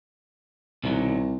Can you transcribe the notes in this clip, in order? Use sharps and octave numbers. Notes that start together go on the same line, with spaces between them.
C2 B2 D#3 F#3